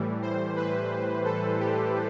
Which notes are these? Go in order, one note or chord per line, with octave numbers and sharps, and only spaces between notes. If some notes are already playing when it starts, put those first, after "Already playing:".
Already playing: A2 E3 G3
C5
B4
A4
G4